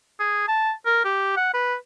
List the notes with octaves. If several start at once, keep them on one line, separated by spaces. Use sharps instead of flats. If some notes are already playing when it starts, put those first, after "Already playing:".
G#4
A5
A#4
G4
F#5
B4